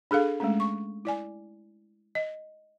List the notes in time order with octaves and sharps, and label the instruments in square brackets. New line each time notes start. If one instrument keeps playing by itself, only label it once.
[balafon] D4 G#4 A4 F5
G#3 A3 C#4
C#6
E4 D5 G#5
D#5